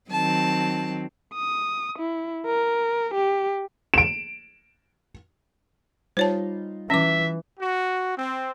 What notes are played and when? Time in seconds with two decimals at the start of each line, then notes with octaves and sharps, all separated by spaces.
0.10 D#3 F#3 C4 A5
1.33 D#6
1.99 E4
2.46 A#4
3.14 G4
3.94 D7 E7
6.17 G3 D#4 F4 C5 C#5 A5
6.90 E3 C#4 E5 D6
7.59 F#4
8.16 C4